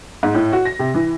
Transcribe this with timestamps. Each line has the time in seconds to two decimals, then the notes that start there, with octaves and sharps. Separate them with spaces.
0.23 G#2
0.34 A2
0.52 F#4
0.65 A#6
0.79 C3
0.95 E3